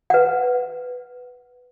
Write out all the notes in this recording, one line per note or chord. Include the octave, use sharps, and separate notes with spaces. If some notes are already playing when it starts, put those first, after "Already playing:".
B4 F#5